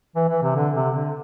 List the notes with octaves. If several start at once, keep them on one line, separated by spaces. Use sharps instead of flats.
E3
E3
C3
D3
C3
D3